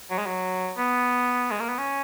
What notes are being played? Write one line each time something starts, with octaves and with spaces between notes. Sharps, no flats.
F#3
G#3
F#3
B3
G#3
A#3
B3
C#4